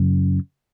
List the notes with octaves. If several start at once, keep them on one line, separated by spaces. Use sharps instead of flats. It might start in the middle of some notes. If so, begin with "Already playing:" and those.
Already playing: F#2 C#3